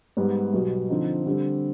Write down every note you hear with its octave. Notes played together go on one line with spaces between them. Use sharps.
G#2 G3 B3
B1 B2 G3
D3 F3 C4 D#4
D3 G3 C4